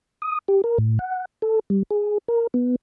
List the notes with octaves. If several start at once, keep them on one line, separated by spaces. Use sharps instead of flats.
D#6
G4
A#4
A2
F#5
A4
G3
G#4
A#4
B3